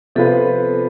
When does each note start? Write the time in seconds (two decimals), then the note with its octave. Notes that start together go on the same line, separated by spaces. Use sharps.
0.16 C3 F3 B3 F4 A4 B4